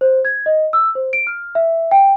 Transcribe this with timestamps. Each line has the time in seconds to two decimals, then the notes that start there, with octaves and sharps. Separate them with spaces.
0.01 C5
0.25 G#6
0.46 D#5
0.73 E6
0.95 C5
1.13 D7
1.27 F6
1.55 E5
1.91 G5